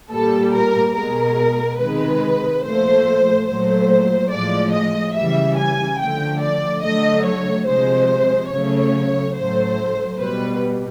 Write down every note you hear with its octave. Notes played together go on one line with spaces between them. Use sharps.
A#2 G3 A4
A#4
B2 G#3 A#4
C3 D#3 G#3 B4
A#2 F3 A3 C5
A#2 F#3 A3 C5
A2 F3 G#3 D5
D#5
C#3 E3 G3 E5
G#5
D3 F3 A3 G5
D5
D3 F#3 A3 D#5
C#5
C3 F3 G#3 C5
C#3 F#3 A3 C#5
A2 F#3 A3 C5
B2 G3 B4